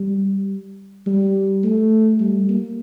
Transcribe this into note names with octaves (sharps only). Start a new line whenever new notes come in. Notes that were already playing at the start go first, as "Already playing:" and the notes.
Already playing: G3
G3
A3
G3
A#3